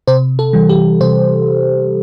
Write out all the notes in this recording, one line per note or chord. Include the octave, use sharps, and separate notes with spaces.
C3 C5
A4
E3 G3
G4
C3 C5